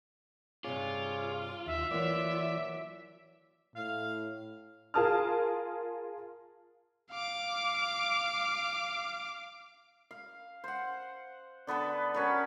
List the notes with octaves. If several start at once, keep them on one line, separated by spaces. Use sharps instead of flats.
G2 C3 D#4 F4 G#4 C#5 D6
D#2 E5
E3 F#3 A#3 B3 D5 D6
A2 F5
F4 G#4 A#4 A5 D#6 F6
F5 D6
F5
C5 F#5
D3 B3 A4 B4
C#4 F#4 A#4 B4